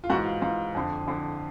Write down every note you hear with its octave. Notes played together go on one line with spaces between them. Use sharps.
F4
G#2 E3 F#4
F4
G#2 E3 F4
F2 D3
F2 D3